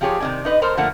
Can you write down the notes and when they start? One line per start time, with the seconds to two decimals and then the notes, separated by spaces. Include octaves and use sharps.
0.01 F3 F4 G4 G#4 C#5
0.20 C3 D#3 E4 D5 G#5
0.45 D#4 B4 D#5
0.62 A4 A#4 C5 A#5
0.77 D3 F3 A3 A#3 F#5